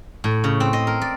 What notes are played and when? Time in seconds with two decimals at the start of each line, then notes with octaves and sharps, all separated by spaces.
0.24 A2
0.44 C#3
0.60 C4
0.73 D#5
0.87 A#4
1.01 D5